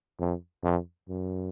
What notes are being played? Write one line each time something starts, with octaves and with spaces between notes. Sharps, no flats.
F2
F2
F#2